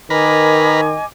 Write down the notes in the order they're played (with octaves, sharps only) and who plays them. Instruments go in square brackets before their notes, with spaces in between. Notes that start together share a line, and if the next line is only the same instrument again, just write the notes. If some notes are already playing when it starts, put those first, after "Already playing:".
[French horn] D#3 [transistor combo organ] A#4 B4 [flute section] D#5 G#5 D6